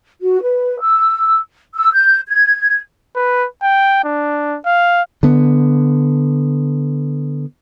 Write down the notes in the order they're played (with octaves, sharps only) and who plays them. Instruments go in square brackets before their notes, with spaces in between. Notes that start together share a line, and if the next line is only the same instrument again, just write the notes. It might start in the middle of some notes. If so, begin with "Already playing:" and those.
[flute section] F#4
B4
E6
E6
G6
G#6
[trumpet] B4
G5
D4
F5
[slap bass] D3 B3